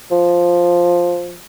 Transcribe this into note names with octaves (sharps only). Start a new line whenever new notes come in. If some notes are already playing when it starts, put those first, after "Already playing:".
F3